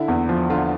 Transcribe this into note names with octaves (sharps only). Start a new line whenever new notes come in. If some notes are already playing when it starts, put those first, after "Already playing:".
Already playing: D3 E4
E2
F3
D3 F4